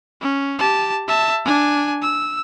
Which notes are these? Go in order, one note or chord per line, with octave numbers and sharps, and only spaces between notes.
C#4
G4 A5
E5 A5
D4 G#5
E6